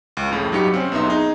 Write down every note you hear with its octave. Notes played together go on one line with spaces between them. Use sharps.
C#2
F2 A2 C#3
G2 F#3 D#4 G4 F5 C#7
C4 C#4 C5
B1 B3 D#4 E5 C6
D#4 G#4